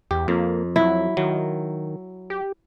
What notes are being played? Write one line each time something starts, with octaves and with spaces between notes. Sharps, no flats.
E2 G4
F2 A#3
F#3 E4
D#3 F#3
G4